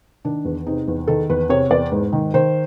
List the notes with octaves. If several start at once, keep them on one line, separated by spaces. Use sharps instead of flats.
D#3 D4
E2
C3 D#4
E2
D#3 A4
E2 B4
C3 C#5
E2 D5
G#2
D#3
D#3 C5